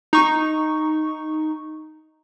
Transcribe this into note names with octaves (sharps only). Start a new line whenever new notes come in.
D#4 C#6